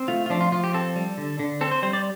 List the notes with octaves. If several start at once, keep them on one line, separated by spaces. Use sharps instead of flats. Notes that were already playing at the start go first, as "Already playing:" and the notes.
Already playing: C4
A3 F4
F4
F3 D4
F4
F3 F4
G4
C4 A4
G3
D3
D3
C4 A4
C5
G3 C5
D5